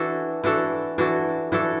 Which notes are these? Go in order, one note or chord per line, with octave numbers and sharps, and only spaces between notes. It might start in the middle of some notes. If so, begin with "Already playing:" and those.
Already playing: E3 D4 F#4 A4
E3 D4 F#4 A4
E3 D4 F#4 A4
E3 D4 F#4 A4